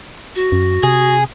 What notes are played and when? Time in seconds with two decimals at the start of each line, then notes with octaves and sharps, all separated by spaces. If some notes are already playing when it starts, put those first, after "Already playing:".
0.35 F#4
0.52 F#2
0.83 C3 G#4